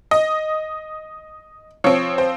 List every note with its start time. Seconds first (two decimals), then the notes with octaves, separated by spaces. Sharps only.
0.11 D#5
1.84 F3 C4 C#5
2.18 C5